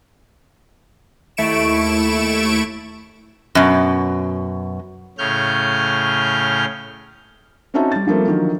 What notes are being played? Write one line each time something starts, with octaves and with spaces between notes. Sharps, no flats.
D#2 A3 E4 C#6 D7 E7
F#2 B2
A2 C#3 C#4 F6 G6
C4 C#4 D#4 F#4 E5 A5
G3 A6
F3 G3 A3 A#3 C4
D3 D#3 F3 F#3